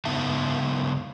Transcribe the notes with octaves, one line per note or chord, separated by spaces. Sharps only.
C#3 B3 D#4 E5 A5